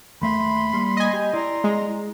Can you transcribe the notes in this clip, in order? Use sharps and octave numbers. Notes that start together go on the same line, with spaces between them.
D#2 A3 E5 B5 C6
G3 A#3
D#5 G#5
G4
E4 D5 A#5 C6
G#3